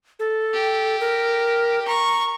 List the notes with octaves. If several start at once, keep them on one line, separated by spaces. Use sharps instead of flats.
A4
G4
A#4
A#5 C#6